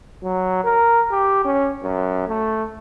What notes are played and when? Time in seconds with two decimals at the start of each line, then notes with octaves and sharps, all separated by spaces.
0.23 F#3
0.64 A#4
1.11 G4
1.45 C#4
1.83 F#2
2.28 A3